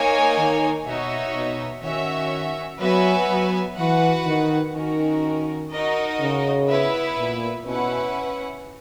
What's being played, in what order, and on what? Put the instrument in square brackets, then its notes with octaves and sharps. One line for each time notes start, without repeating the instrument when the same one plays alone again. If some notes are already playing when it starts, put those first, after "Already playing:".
Already playing: [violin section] A#3 D#4 A#4 C#5 G#5
[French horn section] D#3
[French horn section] B2 [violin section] D#4 F#4 C#5 E5
[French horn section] B2
[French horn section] D#3 [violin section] C#4 F#4 C#5 E5
[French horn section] F#3 [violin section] B3 F#4 B4 E5 G#5
[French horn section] F#3
[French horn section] E3 [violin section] F#4 B4 F#5
[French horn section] D#3
[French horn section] D#3 [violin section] C#4 F#4 A#4
[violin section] D#4 F#4 A#4 D#5
[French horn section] C#3
[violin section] B3 E4 B4 E5
[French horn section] A#2
[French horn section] B2 [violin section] C#4 E4 B4 F#5